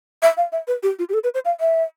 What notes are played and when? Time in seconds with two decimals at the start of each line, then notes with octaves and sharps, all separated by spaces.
0.22 E5
0.37 F5
0.52 E5
0.68 B4
0.83 G4
0.99 F4
1.09 G4
1.14 A4
1.24 B4
1.34 C5
1.45 F5
1.60 E5